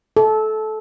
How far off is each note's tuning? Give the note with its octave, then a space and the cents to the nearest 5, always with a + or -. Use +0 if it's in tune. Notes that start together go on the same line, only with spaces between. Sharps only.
A4 -20